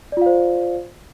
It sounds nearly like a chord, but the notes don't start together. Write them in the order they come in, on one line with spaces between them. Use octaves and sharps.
D5 F4 F5 C5